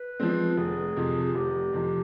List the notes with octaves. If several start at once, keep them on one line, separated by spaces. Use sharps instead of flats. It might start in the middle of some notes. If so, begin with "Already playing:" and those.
Already playing: B4
F3 G#3 C4
F1 G#4
F2 C3 F3
G#4
F1 G4
F2 C3 F3